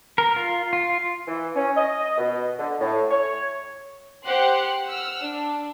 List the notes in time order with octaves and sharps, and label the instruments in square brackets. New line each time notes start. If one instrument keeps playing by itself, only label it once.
[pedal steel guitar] A#4
F4
F4
[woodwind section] E3
C#4
D#5
B2
D3
A2
C#5
[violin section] G4 C5 F#5 C6 F#6
F#5 E6 F6
D4